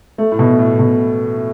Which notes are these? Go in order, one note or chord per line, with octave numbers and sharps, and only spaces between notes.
A3
A2
B2
A2
B2